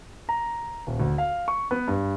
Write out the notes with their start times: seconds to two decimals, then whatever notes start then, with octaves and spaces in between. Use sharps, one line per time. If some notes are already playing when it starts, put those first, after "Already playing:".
0.29 A#5
0.87 D#1
1.00 D2
1.18 F5
1.48 C#6
1.71 B3
1.88 G2